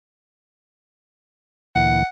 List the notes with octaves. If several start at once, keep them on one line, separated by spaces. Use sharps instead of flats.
D2 A#2 E3 F#5